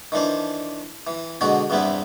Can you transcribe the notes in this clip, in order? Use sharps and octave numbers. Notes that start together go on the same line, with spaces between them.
D#3 E3 D4 C5
E3
B2 D3 G#3 F#4
E2 G2 C3 B3 C4 E4